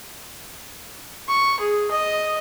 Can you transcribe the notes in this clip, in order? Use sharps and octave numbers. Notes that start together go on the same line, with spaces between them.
C#6
G#4
D#5